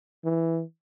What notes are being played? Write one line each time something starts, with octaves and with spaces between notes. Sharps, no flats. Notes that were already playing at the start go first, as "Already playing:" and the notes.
E3